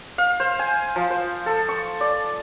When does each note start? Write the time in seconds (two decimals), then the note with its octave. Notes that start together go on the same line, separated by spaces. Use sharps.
0.18 F5
0.40 C5
0.59 G#5
0.96 F3
1.10 C5
1.46 A4
1.69 C#6
2.01 D5